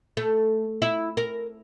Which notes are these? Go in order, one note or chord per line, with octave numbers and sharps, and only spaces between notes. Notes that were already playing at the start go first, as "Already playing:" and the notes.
A3
E4
A#4